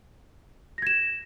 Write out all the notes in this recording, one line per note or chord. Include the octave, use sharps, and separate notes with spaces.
G#6 A#6 E7